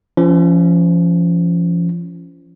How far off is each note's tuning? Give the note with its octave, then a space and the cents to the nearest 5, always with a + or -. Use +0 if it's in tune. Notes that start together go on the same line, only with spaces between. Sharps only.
F3 -30 C#4 +15